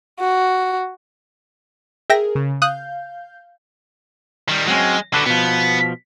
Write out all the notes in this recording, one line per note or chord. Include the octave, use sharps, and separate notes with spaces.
F#4
G#4 A#4 E5 G5 A#6
C#3
F5 D#6 F#6 G6
D#3 G3
F#3 G#3 C4 C#4
D3 D4 F#4 A4 B4
B2 F3 B3